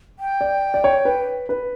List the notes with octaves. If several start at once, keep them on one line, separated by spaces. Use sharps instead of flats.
G5
D5
D5
C#5
B4
B4